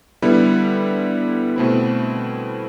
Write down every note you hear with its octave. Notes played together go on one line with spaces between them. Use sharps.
D3 G3 B3 E4
B2 A3 C4 E4